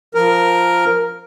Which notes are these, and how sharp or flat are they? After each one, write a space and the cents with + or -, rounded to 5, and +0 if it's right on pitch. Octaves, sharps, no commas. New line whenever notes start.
F3 +0 A#4 +0